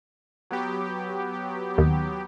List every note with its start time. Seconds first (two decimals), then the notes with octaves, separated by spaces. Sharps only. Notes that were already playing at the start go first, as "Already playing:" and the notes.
0.51 F#3 B3 G4
1.78 D#2